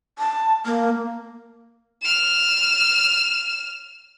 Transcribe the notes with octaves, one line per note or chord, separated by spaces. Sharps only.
A5
A#3
F6 E7